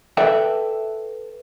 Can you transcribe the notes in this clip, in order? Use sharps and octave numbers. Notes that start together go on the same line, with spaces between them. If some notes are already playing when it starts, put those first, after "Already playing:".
A4 B4 D5 E5 G5